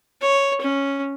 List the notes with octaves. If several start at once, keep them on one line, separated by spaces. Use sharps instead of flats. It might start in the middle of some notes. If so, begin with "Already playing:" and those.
C#5
C#4